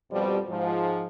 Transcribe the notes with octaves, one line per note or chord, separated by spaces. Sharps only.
F2 B2 F3 G3
G#2 F3